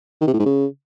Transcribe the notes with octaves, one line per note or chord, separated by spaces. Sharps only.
D#3
C3
A2
G#2
C#3